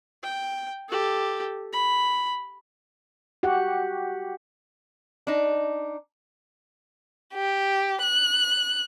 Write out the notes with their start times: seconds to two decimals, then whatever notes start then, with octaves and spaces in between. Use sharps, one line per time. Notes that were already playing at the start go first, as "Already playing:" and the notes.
0.23 G5
0.89 G4 A4
1.73 B5
3.43 F#4 G4 F#5
5.27 D4 D#4
7.34 G4
8.03 F#6